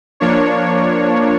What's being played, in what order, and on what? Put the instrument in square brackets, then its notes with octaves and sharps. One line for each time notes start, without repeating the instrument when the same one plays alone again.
[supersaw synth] F3 A#3 D4 C#5